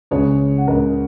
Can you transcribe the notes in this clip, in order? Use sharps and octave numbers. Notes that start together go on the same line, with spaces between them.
C#2 C#3 G#4 C#5
F#5
C#2 C#3 A#4 D#5